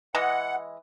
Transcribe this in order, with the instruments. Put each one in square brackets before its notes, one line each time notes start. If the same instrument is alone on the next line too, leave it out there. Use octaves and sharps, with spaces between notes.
[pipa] E3 G#3 D#5 [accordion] F#5